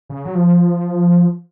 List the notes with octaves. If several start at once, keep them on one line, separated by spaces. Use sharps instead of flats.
C#3
F#3
F3